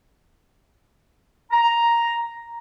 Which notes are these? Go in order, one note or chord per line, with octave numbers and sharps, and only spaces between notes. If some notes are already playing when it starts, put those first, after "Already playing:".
A#5